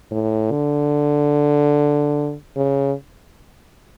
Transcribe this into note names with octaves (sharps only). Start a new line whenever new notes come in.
A2
D3
C#3